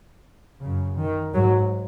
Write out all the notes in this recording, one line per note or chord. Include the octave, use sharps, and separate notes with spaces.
F#2 C#3
D#3
G#2 F#3